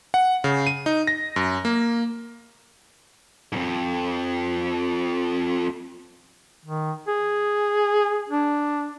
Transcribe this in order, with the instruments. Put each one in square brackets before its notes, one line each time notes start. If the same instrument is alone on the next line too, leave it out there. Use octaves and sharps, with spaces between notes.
[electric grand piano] F#5
C#3
D#7
D#4
A#6
F#2
A#3
[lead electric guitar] F2 G#2
[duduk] D#3
G#4
D4